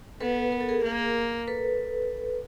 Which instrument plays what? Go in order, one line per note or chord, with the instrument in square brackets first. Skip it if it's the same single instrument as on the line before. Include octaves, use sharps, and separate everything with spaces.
[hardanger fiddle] B3 [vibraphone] A4 B4
[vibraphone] A#4
A4
G#4 A#4
[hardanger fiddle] A#3
[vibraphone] A4 B4